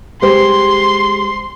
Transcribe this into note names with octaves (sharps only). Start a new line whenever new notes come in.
G#3 G4 C5 C6